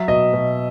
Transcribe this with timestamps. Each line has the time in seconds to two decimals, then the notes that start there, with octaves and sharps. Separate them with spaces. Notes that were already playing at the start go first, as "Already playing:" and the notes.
Already playing: F#3 E5
0.08 B2 D#5
0.33 B2